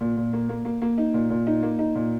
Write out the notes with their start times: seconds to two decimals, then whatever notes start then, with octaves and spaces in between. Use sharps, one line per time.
0.01 A#2
0.17 A#2
0.33 A#3
0.49 A#3
0.65 A#3
0.82 A#3
0.98 D#4
1.14 A#2
1.30 A#2
1.47 D#4
1.63 A#3
1.79 D#4
1.95 A#2